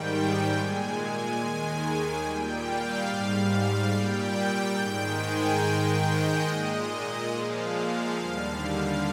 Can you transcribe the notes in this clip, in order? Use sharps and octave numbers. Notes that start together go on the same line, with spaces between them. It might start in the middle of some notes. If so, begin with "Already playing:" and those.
Already playing: G#2 D#3 G3 G5
A#2 G#3 G#5
G#5
D#2 D#3 G#3
A#2 G3 G5
F5
G#2 G3
A#2 G3 G5
G#2 D#3 G#3
G#5
G#2 D#3 G#3 G5
D#5
A#2 G#3 D#5
A#2 F3 G#3 F5
F5
D#2 D3 G3